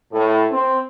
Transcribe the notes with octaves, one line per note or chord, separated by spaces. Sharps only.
A2
C4